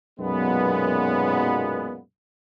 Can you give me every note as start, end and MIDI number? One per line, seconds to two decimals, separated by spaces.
0.20 2.00 35
0.20 2.00 42
0.20 2.00 46
0.20 2.00 56
0.20 2.00 59